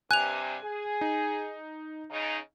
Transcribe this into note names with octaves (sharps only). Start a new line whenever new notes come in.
G2 C3 G#5 F#6 F7
G#4
D#4
C#3 D#4